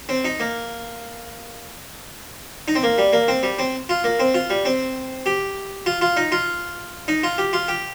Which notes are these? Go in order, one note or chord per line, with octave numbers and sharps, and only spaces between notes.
C4
D#4
A#3
D#4
C4
A#3
G3
A#3
C4
G3
C4
F4
A#3
C4
F4
G3
C4
G4
F4
F4
D#4
F4
D#4
F4
G4
F4
G4